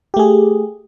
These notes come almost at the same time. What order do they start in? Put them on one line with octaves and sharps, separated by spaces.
G4 A3 G#4